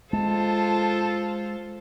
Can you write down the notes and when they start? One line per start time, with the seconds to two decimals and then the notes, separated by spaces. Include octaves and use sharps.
0.13 G#3 F4 A4 C5 A5